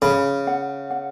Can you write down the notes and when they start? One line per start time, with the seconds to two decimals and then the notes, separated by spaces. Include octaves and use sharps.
0.02 C#3 B5
0.47 F#5
0.91 F#5